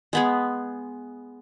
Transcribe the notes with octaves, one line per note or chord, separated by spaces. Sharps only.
G#3 B3 G#4